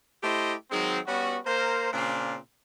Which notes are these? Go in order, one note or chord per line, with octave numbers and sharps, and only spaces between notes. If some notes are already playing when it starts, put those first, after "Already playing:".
A3 E4 G4 C5 D#5
D#3 F#3 G#3 C4
G3 B3 C#4 F#4
A#3 A#4 C5
A#2 C#3 C4 D4 F4